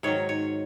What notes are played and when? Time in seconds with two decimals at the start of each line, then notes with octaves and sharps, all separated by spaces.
0.03 G#2 D#3 F#3 C#5
0.29 C#5